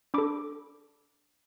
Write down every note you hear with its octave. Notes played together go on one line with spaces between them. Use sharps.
D4 A4 B5 D6